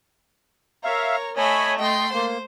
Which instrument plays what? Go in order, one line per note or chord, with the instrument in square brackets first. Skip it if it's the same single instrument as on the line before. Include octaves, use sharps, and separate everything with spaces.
[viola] A#4 C#5 [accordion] E5 F5 [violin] A#5
[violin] A3 B5 [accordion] C#5 G#5 [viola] D#5 E5
[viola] A3 C6 [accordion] D#5 [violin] G5
[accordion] A#3 [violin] C5